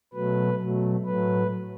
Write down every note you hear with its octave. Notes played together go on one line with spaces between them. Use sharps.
B2 F#3 A3 B4
B2 F#3 A3
A2 F#3 A3 B4